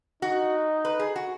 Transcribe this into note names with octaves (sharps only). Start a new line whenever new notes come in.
D#4 F#4
B4
G#4
F#4